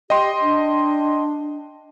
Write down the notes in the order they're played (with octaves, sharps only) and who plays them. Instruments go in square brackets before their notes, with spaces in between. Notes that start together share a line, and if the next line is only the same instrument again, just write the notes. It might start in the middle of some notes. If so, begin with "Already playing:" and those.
[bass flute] G4 [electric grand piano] D#5 G5 C6
[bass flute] D4